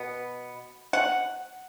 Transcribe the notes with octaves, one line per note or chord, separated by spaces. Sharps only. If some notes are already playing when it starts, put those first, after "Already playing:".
Already playing: B2 B3
F#5